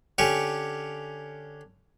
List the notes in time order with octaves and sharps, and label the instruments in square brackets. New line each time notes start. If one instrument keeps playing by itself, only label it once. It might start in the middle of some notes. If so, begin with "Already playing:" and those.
[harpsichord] D3 C#4 G4 C#6